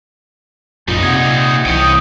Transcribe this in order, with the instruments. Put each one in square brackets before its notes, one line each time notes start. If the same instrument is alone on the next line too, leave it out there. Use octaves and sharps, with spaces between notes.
[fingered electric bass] B1 F#2 [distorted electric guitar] A#2 D#4 [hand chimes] F4
[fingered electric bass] C3 [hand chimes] F#5 D#6 G#6
[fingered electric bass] C2 E3 [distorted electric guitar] C#5 G5 [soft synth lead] D#6